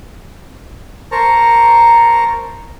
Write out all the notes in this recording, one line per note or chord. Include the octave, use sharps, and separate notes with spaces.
A#4 C5 A5 A#5 C#6